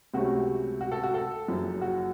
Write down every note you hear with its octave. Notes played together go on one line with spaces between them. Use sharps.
C#2 C3 F#3 A3 C#4 F#4
F#4
A4
F#4
A4
F#1 F#2 F3
F#4